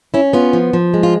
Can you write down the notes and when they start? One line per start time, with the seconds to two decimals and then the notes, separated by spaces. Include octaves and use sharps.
0.14 C#4 E4
0.33 B3 F4
0.53 F3
0.73 F3
0.94 G#3
1.03 F4